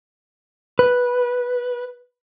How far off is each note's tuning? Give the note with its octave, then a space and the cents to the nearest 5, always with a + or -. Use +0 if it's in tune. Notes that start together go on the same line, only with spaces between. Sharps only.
B4 -10